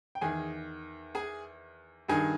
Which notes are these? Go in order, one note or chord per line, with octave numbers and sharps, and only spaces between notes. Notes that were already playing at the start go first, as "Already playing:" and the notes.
G5
E2 D#3 G#4 G#5
G#4 G#5
G2 D#3 G#4 G#5